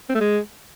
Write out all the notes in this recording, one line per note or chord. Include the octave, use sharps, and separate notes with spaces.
C4
A3
G#3